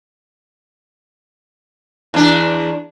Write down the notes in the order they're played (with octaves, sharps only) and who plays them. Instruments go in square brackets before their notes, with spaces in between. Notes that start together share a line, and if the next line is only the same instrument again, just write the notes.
[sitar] E2 D4